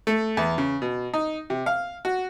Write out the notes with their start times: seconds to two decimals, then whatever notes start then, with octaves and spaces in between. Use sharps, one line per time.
0.07 A3
0.37 E2
0.58 C#3
0.82 B2
1.14 D#4
1.50 C3
1.66 F5
2.05 F#4